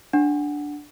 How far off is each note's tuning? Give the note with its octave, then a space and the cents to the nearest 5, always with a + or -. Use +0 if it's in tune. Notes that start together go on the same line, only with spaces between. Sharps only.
D4 +0 F#5 +0